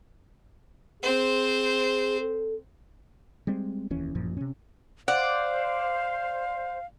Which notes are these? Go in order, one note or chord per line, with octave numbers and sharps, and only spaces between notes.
C4 G#4 C5
A4
G3 G#3 C4
F1 D#2 E3 C#4
A1 F#2 A#2 F3
C3 C#4
C5 D5 F5 F#5